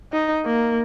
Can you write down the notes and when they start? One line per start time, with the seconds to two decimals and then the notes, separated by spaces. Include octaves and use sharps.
0.13 D#4
0.46 A#3